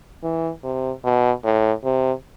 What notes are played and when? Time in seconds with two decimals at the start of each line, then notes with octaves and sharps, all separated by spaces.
0.23 E3
0.64 C3
1.04 B2
1.44 A2
1.84 C3